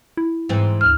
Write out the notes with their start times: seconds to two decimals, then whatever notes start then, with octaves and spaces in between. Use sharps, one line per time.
0.17 E4
0.49 G#2 E3 C4
0.81 D2 F6